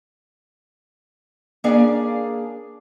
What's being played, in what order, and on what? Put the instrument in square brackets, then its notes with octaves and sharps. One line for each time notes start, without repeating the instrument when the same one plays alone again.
[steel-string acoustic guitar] A#3 C#4 D4 G#4 D5 F5